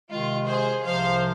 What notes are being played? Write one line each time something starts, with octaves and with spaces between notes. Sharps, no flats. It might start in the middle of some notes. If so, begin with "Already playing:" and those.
C3 D#3 G#3 F4
G#4 C5
C2 C3 F3 C5 F5